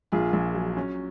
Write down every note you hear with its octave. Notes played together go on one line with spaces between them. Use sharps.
A#1 F4 G#4
A#1
F#3
C#4